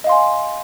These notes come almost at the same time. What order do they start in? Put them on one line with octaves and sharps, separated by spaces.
D#5 F5 C6 G#5